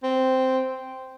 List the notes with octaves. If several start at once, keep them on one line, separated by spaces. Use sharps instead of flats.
C4